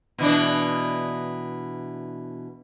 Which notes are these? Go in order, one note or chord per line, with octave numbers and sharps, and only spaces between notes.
B2 E3 D4